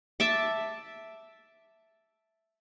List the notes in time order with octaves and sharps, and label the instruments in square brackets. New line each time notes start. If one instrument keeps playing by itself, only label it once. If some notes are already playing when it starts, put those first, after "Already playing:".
[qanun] E5 A5 D6